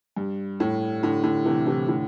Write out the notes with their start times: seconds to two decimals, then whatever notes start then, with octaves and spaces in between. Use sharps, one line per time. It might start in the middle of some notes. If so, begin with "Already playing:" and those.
0.16 G2
0.60 A2
1.02 A2 D3
1.24 A2 D3
1.45 C3 E3
1.66 C3 E3
1.88 A2 D3